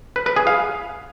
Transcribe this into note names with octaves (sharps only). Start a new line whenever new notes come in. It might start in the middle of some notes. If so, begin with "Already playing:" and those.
B4
B4
G#4
F5